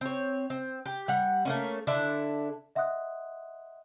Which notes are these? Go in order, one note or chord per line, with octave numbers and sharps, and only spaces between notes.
C4 C#5
C4
G4
G3 F#5
A3 A#3 C#4
D3 D4 E4 A4
D#5 E5 F#5 C6 D#6 F#6